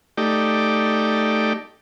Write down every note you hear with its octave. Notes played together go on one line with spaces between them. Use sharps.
A3 D#4 G4 D5